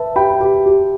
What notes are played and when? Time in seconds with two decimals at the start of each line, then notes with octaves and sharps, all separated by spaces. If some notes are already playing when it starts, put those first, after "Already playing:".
Already playing: B4 E5 A5
0.16 G4 G5 B5
0.40 G4
0.66 G4